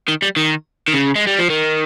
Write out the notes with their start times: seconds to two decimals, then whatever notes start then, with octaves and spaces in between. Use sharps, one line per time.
0.08 D#3
0.22 G3
0.37 D#3
0.88 D#3
0.94 C#3
1.16 G#3
1.27 G3
1.39 F3
1.50 D#3